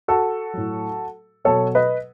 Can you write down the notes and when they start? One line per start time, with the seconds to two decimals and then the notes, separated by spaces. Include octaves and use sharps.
0.08 F#4 A4
0.54 A2 F#3
1.45 B2 F#3 A4 C#5
1.75 B4 D#5